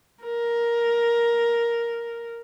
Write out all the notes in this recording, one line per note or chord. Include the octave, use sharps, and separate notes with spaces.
A#4